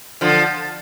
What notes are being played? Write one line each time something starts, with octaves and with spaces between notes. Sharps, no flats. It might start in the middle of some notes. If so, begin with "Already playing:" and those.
D3 F3